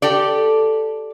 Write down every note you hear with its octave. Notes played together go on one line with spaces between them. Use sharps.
G4 A4 D5